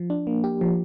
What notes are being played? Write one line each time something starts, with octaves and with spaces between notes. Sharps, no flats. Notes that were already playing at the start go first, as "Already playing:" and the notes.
Already playing: F3
D4
A#3
G4
F3